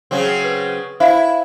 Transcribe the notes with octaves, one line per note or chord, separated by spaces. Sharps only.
C#3 F#3 C4
B4
E4 C5 E5 F5